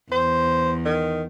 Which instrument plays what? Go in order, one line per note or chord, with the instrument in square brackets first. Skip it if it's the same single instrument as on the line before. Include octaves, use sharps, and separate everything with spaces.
[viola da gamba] E2 [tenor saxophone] C5
[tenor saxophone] D#3